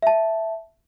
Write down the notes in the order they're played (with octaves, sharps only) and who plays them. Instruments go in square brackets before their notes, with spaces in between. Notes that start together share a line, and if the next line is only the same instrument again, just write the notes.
[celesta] E5 A5